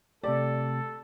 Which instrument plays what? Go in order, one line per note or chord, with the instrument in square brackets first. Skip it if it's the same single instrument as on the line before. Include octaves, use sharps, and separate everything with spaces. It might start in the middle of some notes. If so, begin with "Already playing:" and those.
[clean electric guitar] C3 A3 G4 [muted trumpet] A4 [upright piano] D5